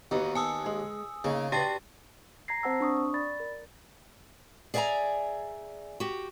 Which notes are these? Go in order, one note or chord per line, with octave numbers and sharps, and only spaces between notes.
D#2 B3 D#4 F#4
A4 F#5 G#5 D#6 E6
G#3
C#3 A#3 C#4 D#4
D4 F#4 G4 B4 G5 A6
A#5 G#6 A#6 C7
C4 C5 F#5 A5 E6
D4 C#6 D#6
D5 B5 A6
A#4
G#4 D5 E5 G5 G#5 A#5
F#4 G4